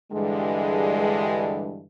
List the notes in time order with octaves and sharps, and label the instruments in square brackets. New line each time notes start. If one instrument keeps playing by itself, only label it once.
[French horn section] G2 D3 E3 G3 G#3